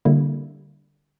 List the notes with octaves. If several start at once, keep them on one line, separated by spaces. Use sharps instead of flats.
D3 G3 A#3 E4